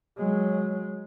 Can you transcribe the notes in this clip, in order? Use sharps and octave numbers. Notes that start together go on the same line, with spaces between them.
F#3 G#3